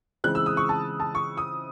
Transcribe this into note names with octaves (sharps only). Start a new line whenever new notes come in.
C#3 E3 G#3 C4 F#6
E6
D#6
C#6
A5
A5
C#6
D#6